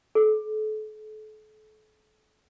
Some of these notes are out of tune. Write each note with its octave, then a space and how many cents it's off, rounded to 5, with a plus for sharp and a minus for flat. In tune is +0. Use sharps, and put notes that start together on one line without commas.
A4 -35